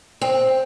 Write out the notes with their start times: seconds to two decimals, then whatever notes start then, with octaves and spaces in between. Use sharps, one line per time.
0.21 C4